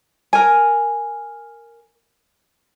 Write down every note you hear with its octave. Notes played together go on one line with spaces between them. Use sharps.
A#4 G#5